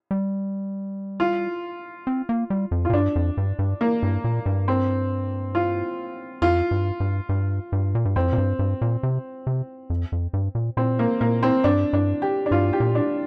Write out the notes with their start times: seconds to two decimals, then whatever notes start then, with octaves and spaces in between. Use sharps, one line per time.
0.11 G3
1.20 F4
2.07 C4
2.29 A#3
2.50 G3
2.71 F2
2.85 F4
2.90 A#2
2.93 G2 D4
3.16 F2
3.37 G2
3.59 G2
3.81 A#3
4.03 G2
4.24 A#2
4.46 G2
4.68 C4
5.55 F4
6.42 F2 F4
6.71 G2
7.00 G2
7.29 G2
7.72 G2
7.95 A#2
8.05 G2
8.16 F2 C4
8.33 A#2
8.38 G2
8.59 G2
8.81 A#2
9.03 C3
9.47 C3
9.90 F2
10.12 F2
10.33 G2
10.55 A#2
10.77 A#2 C4
10.99 A#3
11.21 A#2 A#3
11.43 C4
11.64 G2 D4
11.93 G2 D4
12.22 G4
12.46 D4
12.51 G2 F4
12.73 G4
12.80 A#2
12.95 D4